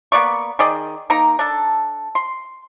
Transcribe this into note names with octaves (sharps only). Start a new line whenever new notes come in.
A#3 B3 D5 C#6
D#3 G#4 D5 D#5
A#3 D#4 A#5
D4 A4
C6